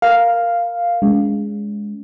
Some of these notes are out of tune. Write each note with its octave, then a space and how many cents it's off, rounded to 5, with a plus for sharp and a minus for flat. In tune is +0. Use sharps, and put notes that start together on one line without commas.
A#4 +0 F5 +0
G#3 +0 C#4 +40